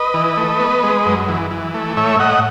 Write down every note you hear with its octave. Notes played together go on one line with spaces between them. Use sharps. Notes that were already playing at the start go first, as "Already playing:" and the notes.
Already playing: B4 D#5
E3
A3
B3
G#3
F#2
E3
E3
A3
A2 C#5 E5
A2 D#5 F#5